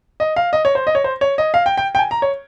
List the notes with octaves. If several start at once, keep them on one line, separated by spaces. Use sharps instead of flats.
D#5
F5
D#5
C#5
C5
D#5
C#5
C5
C#5
D#5
F5
G5
G5
G5
G#5
A#5
C#5